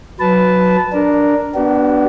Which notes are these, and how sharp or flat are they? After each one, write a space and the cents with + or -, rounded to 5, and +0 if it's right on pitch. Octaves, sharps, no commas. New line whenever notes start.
F#3 -10 B4 +5 A5 -15
D4 +0 A#4 +0
B3 -5 D4 +0 F#4 +45